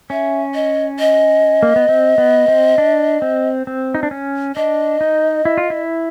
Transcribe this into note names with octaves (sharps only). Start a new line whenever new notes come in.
C#4 E5
D#5
D#5
A#3
B3
C4
B3
C4
D4
C4
C4
D#4
D4
C#4
D4 D#5
D#4
E4
F4
E4